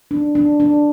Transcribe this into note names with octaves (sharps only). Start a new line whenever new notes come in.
D4
D4
D4